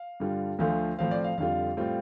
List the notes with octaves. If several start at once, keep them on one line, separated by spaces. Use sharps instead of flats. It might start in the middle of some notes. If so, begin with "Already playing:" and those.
Already playing: F5
G2 D3 G3 F4
D2 D3 F3 A3 F4 F5
A2 F3 C4 F5
D5
F5
F2 D3 G3 F4 F5
A2 G3 C4 F4